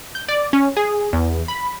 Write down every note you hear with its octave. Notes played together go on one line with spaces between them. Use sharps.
G6
D5
C#4
G#4
E2
B5